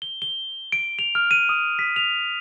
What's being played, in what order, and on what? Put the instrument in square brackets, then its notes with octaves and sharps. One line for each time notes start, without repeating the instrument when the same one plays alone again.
[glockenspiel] G7
G7
D7
F7
F6
D#7
D#6
B6
F7